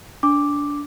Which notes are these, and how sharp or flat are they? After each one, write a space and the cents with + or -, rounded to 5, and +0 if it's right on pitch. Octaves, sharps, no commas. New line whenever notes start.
D4 -20 D6 +0